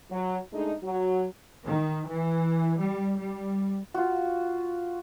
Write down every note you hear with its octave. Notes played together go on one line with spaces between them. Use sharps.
F#3
G#3 A3 D4 D#4
F#3
D#3
E3
G3
G3
F4 F#4